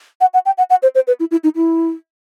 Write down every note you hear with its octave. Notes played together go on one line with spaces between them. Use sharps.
F#5
F#5
G5
F#5
F#5
C5
C5
B4
E4
E4
D#4
E4